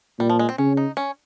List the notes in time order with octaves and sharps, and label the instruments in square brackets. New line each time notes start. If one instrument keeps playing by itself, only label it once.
[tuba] A#2 [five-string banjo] G3
[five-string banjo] F3
G#3
C4
[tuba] C#3 [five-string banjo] C#4
[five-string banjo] D#4
C#4